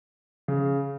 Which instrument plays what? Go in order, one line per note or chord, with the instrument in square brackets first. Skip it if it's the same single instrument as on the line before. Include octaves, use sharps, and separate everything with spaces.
[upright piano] C#3